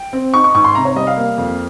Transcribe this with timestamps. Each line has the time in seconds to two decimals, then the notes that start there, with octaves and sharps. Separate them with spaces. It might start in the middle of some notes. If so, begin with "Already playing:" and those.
Already playing: G5
0.13 C4
0.33 D#4 C#6
0.44 C#6
0.54 G#2 C#6
0.64 C6
0.75 C3 A#5
0.85 C#5
0.96 G3 D#5
1.07 F5
1.17 A#3
1.38 F2